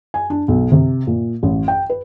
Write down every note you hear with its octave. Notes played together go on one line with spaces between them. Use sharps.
G#5
D4
B1
C3
A#2
A1
G5
B4